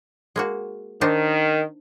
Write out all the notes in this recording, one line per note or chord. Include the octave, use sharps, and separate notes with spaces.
G#3 A#3 F#4
D#3 D4 D#4 C5